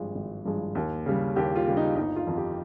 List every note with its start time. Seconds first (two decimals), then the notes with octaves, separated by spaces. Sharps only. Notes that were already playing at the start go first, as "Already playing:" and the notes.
Already playing: G#1 G2 F3 G#3
0.15 G#1
0.45 G2 F3 G#3
0.75 D#2
1.06 C#3 G3
1.36 D#2 G4
1.56 F4
1.67 C#3 G3
1.77 D#4
1.96 G1 D#4
2.16 F4
2.27 F2 D#3
2.37 G4